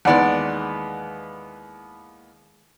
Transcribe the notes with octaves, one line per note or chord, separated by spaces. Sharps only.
D#2 E3 G#3 B3 D5 F#5